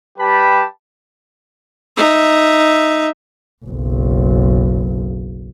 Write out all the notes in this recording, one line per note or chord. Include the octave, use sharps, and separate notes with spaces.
G3 G4 B4 A5 B5
D#4 E5
F#1 B1